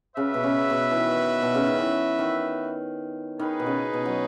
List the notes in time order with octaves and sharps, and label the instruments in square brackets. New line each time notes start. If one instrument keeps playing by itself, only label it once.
[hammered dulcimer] C#3 [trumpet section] F#4 B4 E5
[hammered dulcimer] B2
C#3
B2
E3
D#3
B2
C#3
D#3
E3
D#3
[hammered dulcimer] D#3 [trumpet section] D#4 G#4 B4
[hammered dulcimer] B2
C#3
B2
F#3